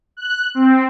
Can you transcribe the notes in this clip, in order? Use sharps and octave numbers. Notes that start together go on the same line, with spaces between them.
F#6
C4